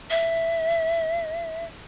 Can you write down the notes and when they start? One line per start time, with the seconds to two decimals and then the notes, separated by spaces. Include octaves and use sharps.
0.10 E5